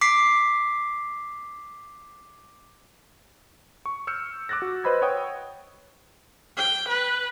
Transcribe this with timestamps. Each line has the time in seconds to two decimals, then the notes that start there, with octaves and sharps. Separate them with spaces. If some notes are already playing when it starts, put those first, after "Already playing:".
0.01 D6 B6 C7
3.86 C#6
4.07 E6 F6 G6 C#7
4.49 D6 E6 F#6 A6 A#6
4.62 F#4
4.84 B4 C5 D#5 B5 E6 G#6
5.02 C#5 F#5 G5 D#6
6.57 G5
6.88 B4